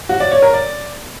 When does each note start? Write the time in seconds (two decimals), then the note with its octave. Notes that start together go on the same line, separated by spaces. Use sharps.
0.09 F#4
0.20 D5
0.31 C#5
0.42 A#4
0.53 D5